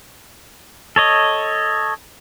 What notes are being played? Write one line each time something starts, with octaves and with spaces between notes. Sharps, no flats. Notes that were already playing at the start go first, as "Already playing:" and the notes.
A4 C#5 D#5